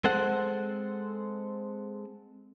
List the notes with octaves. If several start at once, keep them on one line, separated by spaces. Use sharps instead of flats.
G#3 C4 A4 C5 F#5